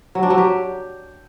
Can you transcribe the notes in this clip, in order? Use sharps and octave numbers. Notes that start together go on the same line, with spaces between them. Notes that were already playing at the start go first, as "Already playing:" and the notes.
F#3
D4
F#3
G4